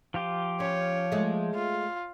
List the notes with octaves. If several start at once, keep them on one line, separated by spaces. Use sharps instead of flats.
F3 F4 G4
C#4 C#5
G#3 A3
F4